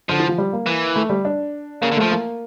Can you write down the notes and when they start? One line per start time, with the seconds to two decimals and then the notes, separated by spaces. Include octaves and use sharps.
0.09 D3 F3
0.19 E3
0.29 F3
0.38 G3
0.53 A#3
0.66 E3
0.96 A3
1.09 G3
1.25 D4
1.81 C#3 A#3
1.92 D3
1.97 F3 A3
2.11 A#3